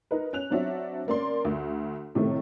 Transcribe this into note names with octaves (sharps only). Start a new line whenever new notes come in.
D#4 A#4 B4
C#4 F#6 F7
F#3 C4 D4 F#4 E5
C#3 A#3 D5 C6
D2
A2 C3 D#3 A3